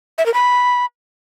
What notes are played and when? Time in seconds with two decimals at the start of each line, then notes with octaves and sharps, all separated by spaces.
0.18 E5
0.26 A#4
0.34 B5